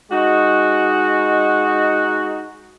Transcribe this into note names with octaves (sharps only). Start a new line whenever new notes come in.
G#3 D#4 F#4